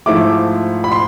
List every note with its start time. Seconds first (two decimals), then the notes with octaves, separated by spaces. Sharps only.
0.06 G#2 F3 A3 E4 D6
0.84 B5
0.92 C6